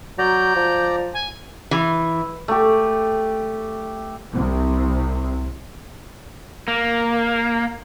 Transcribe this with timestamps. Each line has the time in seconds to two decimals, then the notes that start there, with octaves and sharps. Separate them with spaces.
0.18 F#3 D5 A#5 G6
0.56 F3
1.13 G#5
1.71 E3
2.48 A3 G4
4.31 C2 C3
6.68 A#3